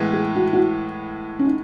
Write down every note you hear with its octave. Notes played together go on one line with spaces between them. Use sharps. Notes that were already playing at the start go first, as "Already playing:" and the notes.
Already playing: A2 E3 G#3 B3
G#4
F#4
F#4
E4
C#4
D#4